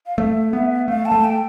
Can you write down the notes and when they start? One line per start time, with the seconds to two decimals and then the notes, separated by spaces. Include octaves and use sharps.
0.06 F5
0.18 A3 E5
0.53 B3
0.88 A3 F5
1.06 A5
1.12 A3
1.24 G5